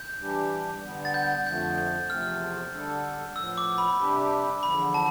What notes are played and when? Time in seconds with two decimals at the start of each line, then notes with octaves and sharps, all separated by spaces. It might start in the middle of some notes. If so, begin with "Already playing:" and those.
Already playing: G6
0.20 E3 G3 D4 G4
0.83 D3 G3 B3
1.05 A6
1.14 G6
1.46 F2 D3 F3 A3 G6
1.78 G6
2.09 E2 C3 F3 A3 C4 F6
2.72 D3 G3 D4 A4
3.35 A2 F3 B3 E6
3.58 D6
3.78 B5
3.99 C3 G3 D4 G4 B4
4.63 E2 D3 F3 B5
4.94 A5